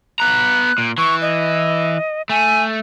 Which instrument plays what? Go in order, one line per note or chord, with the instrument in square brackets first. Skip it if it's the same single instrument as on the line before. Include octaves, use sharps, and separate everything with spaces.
[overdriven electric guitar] B3 A#5 [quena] F#6
[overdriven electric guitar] A#2
[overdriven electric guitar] E3 [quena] C#6
[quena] D#5
[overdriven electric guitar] A3 [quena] G#5